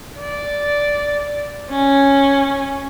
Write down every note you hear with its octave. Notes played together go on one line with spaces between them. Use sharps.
D5
C#4